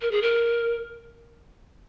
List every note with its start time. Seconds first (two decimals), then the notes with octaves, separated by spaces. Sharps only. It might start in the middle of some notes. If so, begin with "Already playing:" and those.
0.02 A#4
0.11 G#4
0.22 A#4